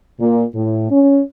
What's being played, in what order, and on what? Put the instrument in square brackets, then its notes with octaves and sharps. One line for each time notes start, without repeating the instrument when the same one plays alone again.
[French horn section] A#2
A2
C#4